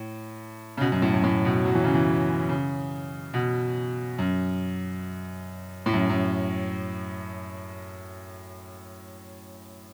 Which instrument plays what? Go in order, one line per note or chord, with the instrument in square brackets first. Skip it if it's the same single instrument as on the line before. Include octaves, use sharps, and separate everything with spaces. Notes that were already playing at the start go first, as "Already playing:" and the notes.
Already playing: [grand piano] A2
C#3
B2
F#2
A2
F#2
A2
B2
F#3
E3
C#3
E3
C#3
B2
F#2
A2
F#2
F#2